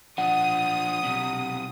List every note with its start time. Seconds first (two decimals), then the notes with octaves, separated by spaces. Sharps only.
0.18 F3 D4 F#5 D#6
1.03 B1 C3